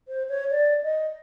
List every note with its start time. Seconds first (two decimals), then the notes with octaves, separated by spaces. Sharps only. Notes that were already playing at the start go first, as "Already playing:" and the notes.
0.08 C5
0.29 C#5
0.51 D5
0.83 D#5